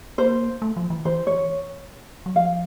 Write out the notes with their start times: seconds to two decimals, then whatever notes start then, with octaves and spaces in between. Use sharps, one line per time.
0.18 A#3 C5
0.62 A3
0.77 F3
0.90 E3
1.05 E3 C5
1.27 C#5
2.26 F#3
2.35 F3 F5